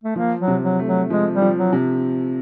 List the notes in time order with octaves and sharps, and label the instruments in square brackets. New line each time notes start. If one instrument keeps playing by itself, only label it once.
[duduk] A3
[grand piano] F3 [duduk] A#3
[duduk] F#3
[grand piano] C3
[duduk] F#3
[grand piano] A3
[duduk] F#3
[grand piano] F3 [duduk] G#3
[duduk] G3
[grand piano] F3
[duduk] F#3
[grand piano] C3